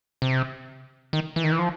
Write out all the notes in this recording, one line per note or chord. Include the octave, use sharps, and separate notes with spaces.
C3
D#3
E3
D#3
E3
F3